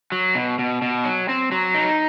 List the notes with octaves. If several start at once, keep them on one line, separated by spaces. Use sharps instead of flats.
F#3
B2
B2
B2
F#3
C4
F#3
D#4